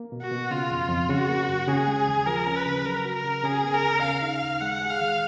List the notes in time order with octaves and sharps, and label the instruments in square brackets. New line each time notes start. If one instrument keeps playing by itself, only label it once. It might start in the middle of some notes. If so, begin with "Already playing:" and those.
Already playing: [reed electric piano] A#3
B2
[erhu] F#4
[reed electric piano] B2
[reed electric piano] C#3 [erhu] F4
[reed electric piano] F2
F2
[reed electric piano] C#3 [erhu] F#4
[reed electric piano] A#3
F#2
[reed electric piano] C#3 [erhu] G#4
[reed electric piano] G#3
D#2
[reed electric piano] F3 [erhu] A#4
[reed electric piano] C#4
[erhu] B4
[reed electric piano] C#3
[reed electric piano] F#3 [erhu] A#4
[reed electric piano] F#4
[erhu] A#4
[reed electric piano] C#3
[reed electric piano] C#3 [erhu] G#4
[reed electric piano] B3
[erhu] A#4
[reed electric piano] D#2
[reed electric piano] C#3 [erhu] F5
[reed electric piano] D#4
D#2
[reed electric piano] G#3 [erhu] F#5
[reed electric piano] G#4
[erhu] F5
[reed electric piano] D#3